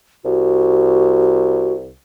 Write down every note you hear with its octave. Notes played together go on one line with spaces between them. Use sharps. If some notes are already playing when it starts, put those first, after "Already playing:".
C2 F#4